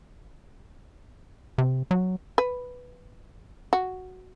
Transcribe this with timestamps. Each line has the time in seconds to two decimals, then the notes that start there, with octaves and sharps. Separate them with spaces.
1.58 C3
1.91 F#3
2.38 B4
3.73 F#4